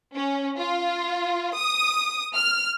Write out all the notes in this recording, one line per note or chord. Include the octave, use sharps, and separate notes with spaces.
C#4
F4
D#6
F6